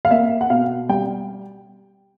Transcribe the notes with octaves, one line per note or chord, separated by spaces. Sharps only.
F5
A#3 E5
F#5
B2 F5
G3 G5